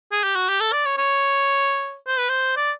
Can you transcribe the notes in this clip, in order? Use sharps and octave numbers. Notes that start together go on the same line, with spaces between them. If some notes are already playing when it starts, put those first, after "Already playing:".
G#4
G4
F#4
G4
A4
D5
C#5
C#5
C5
B4
C5
D5